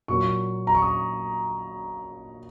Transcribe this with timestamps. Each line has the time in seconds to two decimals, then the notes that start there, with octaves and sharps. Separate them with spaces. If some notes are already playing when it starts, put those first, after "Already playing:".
0.08 A#2 F#3 A#3 C#6
0.67 A#5
0.75 C#6
0.82 D#6